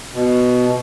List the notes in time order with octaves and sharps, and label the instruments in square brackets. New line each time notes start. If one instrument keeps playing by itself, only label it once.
[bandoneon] B2